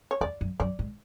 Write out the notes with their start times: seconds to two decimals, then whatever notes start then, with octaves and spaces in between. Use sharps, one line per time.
0.11 C#5
0.21 E2 D5
0.41 F#2
0.60 F#2 D5
0.79 G#2